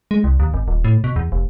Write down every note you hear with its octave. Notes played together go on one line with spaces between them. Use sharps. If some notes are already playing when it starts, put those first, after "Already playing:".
G#3
C2
D#2
G#1
D#1
A2
B2
E2
F1